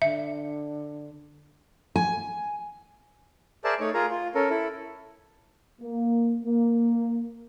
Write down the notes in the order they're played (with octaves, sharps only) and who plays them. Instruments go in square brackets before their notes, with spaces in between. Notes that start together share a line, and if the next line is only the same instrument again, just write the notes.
[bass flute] D3 [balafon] E5
[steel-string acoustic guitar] G#5
[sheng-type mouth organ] G#4 A#4 C5 D5 E5 A5
A3 D#4 C#5
F4 G#4 A#4 A#5
F4
C#4 A4 A#4
E4 A4
[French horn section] A#3
A#3